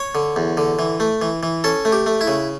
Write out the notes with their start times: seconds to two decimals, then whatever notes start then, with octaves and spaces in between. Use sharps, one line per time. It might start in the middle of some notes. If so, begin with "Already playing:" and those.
Already playing: C#5
0.15 D3
0.36 E2
0.57 D3
0.79 E3
1.00 A3
1.22 E3
1.43 E3
1.64 C#4 A4
1.85 A3
1.92 G4
2.06 A3
2.21 E4
2.27 C#3